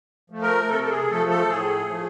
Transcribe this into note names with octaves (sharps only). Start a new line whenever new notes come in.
F3 A3
A#4
C3 A4
A4
G#4
F3 A3 A4
A4
A2 G#4
F3 A3